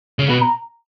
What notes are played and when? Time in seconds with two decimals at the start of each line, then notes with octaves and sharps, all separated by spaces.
0.19 C#3
0.29 B2 B5
0.42 A#5